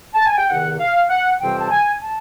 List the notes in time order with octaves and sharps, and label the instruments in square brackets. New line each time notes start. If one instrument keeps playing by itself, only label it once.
[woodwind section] A5
G#5
G5
E2 C3 D#3 F#5
F5
F#5
F2 C3 E3 G3 C4 G5
A5
G#5
A5